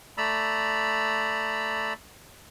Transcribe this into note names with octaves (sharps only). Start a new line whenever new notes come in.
A3 D5 A#5 B5 E6